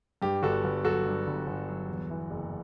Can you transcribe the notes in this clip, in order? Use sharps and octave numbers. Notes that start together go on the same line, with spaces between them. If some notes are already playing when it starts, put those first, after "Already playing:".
G2 G4
G1 F#4 A4
G1
F#3 F#4 A4
G2
G1
G1
F#3
E2
E3
F#1